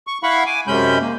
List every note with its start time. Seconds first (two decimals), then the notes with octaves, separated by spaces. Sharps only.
0.07 C#6
0.23 E4 F5 F#5 B5 C#6
0.46 G#5 D6
0.67 F#2 C3 G#3 C#4 B5 G6
1.00 A#3